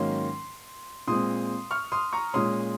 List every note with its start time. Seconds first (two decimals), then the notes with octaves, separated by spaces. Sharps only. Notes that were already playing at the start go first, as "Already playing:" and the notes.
Already playing: G#2 D#3 F#3 A#3 C#4 C6
1.08 A#2 G#3 C4 C6 D#6
1.71 C#6 F6
1.92 C6 D#6
2.13 A#5 C#6
2.34 A#2 G#3 C#4 C6 D#6